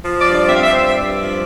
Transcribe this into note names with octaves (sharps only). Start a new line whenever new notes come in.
F3
D5
G2
D5
C4 E5
F5
E5
G2 C5
E5
G2 D5
F3